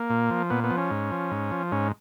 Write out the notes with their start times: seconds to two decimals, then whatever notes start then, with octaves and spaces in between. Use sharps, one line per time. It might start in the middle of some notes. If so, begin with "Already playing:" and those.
Already playing: A#3
0.10 A#2
0.30 F3
0.50 A#2 B3
0.64 B3
0.70 F3
0.78 C#4
0.91 G#2
1.11 F3
1.31 G#2
1.52 F3
1.72 G#2 C#4